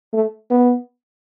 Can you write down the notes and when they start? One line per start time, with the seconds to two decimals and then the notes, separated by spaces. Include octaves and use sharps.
0.13 A3
0.51 B3